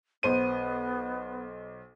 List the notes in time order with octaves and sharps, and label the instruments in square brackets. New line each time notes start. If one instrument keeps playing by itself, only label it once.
[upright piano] B1 C5 D#7 [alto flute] B3